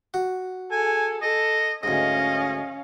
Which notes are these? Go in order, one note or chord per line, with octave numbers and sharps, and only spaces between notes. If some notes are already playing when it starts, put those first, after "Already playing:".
F#4
G#4 A4 G#5
A4 D#5
D2 G#2 C#4 D#5 F5